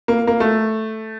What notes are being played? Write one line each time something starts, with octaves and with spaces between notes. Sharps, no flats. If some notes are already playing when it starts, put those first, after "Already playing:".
A#3
A#3
A3